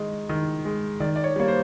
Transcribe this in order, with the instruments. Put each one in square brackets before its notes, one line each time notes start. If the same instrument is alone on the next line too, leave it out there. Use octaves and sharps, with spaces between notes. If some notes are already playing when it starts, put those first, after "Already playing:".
Already playing: [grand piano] D#3 G#3 D#5
D#3
G#3
D#3 D5
D5
C#5
G3 A#3 C#5
C5